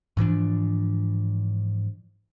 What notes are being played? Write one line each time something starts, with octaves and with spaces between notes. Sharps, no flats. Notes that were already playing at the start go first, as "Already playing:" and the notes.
G#2 E3 F3 D4